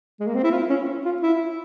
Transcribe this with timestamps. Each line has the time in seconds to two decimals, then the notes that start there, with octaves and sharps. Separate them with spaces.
0.20 G#3
0.27 A#3
0.35 C4
0.44 E4
0.52 F4
0.70 C#4
1.06 F4
1.22 E4